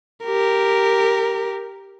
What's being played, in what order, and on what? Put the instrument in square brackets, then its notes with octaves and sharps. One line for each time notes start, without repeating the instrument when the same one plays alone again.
[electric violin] G4 A#4